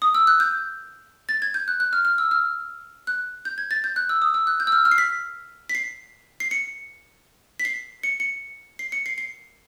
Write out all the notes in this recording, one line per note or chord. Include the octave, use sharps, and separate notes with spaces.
D#6
E6
F#6
G6
A6
G#6
G6
F#6
F#6
F6
F6
E6
F6
F#6
G6
G#6
A6
G6
F#6
E6
D#6
E6
F#6
G6
E6
F6
F6
C7
B6
B6
C7
C7
C#7
B6
C7
C#7
C#7
C7
C#7
C7
C7